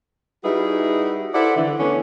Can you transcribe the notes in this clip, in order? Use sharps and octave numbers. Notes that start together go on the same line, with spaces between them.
G3 D#4 E4 F#4 G#4 B4
E4 A4 C5 D5 E5 F#5
D3 E3
E3 A3 B3 C#4 D4